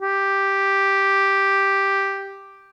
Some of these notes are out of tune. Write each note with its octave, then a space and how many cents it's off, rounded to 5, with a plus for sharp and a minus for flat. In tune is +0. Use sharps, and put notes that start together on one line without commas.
G4 +0